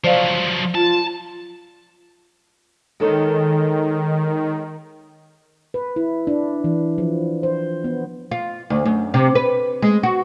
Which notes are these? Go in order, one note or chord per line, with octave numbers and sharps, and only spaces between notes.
F3 F#3 C5 D5 F5
F4 A5
D#3 G#3 A4 C#5
B4
E4
D4
E3
F3
C5
B3
F4
D2
F#2
C3
B4
G#3
F#4